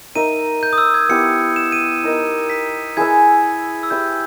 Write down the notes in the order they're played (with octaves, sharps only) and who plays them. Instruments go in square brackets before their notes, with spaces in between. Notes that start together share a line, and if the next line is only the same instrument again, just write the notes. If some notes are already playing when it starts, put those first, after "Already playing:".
[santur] D#4 A#4 E5 [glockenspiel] D#7
[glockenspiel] G6
D#6
E6
G#6
[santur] B3 E4 G4 B4 [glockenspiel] C#7
[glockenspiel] E7
D#7
[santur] D#4 A#4 D#5
[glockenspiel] B6
[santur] E4 G#4 B4 E5 [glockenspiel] G#6
[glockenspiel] E6
[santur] E4 G4 B4 E5 [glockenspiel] G6